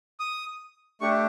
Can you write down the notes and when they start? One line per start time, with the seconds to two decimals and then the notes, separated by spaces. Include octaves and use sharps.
0.20 D#6
1.01 A3 D4 G4 C#6